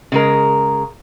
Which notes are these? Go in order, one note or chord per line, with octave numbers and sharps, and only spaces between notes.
C#3 G#3 A#4